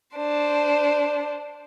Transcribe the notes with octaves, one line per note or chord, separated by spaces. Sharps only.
D4 C5